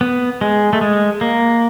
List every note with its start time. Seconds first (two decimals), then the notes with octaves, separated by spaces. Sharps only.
0.01 B3
0.41 G#3
0.73 A3
0.81 G#3
1.21 A#3